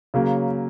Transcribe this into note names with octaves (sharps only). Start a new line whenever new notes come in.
C#3 F#3 A#3